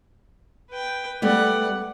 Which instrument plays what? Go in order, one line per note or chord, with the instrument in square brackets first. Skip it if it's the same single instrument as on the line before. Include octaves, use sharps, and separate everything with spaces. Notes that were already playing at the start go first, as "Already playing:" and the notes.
[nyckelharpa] B4 G5
[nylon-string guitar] G3 A3 B3 [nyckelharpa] D5 F#5